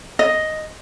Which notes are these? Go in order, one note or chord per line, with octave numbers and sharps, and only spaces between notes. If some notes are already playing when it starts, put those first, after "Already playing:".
D#5